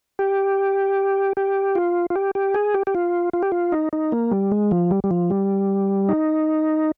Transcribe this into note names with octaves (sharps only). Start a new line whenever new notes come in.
G4
G4
F4
F4
G4
G4
G#4
G4
G4
F4
F4
G4
F4
D#4
D#4
A#3
G3
G#3
F3
G3
G3
F3
G3
D#4